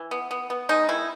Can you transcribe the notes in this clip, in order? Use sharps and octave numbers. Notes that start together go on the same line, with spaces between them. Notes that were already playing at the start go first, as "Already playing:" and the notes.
Already playing: E3
B3
B3
B3
G#3 D#4
D#3 E4